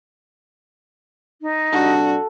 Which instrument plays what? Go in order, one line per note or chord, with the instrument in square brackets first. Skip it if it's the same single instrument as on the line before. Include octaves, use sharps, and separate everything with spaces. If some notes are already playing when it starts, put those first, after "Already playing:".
[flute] D#4
[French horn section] C3 G3 D4 [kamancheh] F#4 [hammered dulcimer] A4